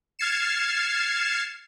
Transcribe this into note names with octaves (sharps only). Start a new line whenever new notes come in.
F6 G#6 A6 C7 C#7 E7